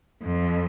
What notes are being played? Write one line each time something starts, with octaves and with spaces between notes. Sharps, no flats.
F2